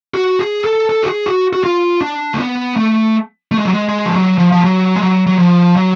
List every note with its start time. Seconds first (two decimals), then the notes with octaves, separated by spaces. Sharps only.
0.14 F#4
0.39 G#4
0.64 A4
0.89 A4
1.03 F#4
1.08 G#4
1.26 F#4
1.53 F#4
1.64 F4
2.01 D4
2.34 A3
2.39 B3
2.76 A3
3.51 A3
3.58 G#3
3.65 F#3
3.73 G#3
3.89 G#3
4.06 F3
4.14 F#3
4.38 F3
4.52 F3
4.64 F#3
4.96 G#3
5.01 F#3
5.27 F#3
5.39 F3
5.76 F#3